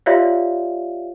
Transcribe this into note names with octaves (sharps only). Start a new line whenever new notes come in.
F4 G4 C#5 D5 E5 F5